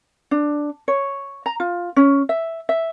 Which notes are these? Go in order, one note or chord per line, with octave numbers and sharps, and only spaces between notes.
D4
C#5
A#5
F4
C#4
E5
E5